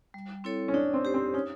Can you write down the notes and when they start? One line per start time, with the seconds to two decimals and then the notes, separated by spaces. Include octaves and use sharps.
0.14 G3
0.44 C4 E4 A4 C#5
0.68 C#4
0.74 D4 D#4
0.94 C4
1.05 G4 C5
1.14 C4
1.34 C#4 D#4